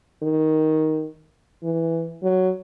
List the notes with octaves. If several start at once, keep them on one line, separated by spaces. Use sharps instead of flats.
D#3
E3
F#3